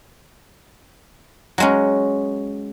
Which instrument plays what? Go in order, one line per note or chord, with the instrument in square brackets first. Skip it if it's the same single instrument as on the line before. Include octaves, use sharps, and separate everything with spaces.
[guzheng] F#3 G#3 C#4